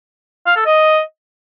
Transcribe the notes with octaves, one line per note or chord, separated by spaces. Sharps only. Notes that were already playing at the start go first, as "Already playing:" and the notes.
F5
A4
D#5